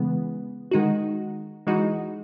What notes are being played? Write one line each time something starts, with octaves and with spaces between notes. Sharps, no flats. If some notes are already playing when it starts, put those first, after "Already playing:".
Already playing: C#3 E3 G#3 B3
D#3 G#3 D#4 F#4
E3 G#3 D#4 F#4